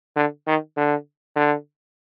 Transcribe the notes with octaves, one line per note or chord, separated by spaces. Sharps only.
D3
D#3
D3
D3